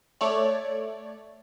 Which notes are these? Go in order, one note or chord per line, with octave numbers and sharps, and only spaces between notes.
A3 C#5 D5